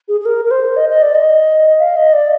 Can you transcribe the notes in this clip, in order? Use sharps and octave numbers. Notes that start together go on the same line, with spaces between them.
G#4
G#4
A#4
A#4
C5
D#5
D#5
D5
D#5
F5
D#5
D5